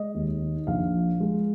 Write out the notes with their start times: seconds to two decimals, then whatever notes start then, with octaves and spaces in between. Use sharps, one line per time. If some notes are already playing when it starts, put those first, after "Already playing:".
Already playing: G#3 D#5
0.15 D#2
0.41 D#3
0.67 A#1 F5
0.94 F3
1.20 G#3